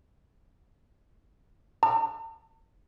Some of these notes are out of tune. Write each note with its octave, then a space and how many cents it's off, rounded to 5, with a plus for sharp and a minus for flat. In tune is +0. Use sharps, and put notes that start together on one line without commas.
A5 +45